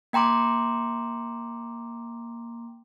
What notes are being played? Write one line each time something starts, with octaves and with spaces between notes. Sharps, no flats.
A#3 G5 A#5 C6 D6